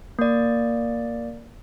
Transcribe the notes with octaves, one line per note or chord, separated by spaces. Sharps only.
A#3 D5